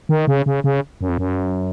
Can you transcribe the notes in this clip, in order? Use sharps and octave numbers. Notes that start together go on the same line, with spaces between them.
D#3
C#3
C#3
C#3
F#2
F2
F#2